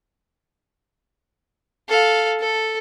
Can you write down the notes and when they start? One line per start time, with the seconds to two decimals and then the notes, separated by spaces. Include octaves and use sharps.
1.89 A4 F5
2.40 A4